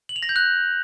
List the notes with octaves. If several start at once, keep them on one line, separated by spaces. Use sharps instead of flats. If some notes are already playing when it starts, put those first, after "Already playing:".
F#7
F7
A#6
G6
F#6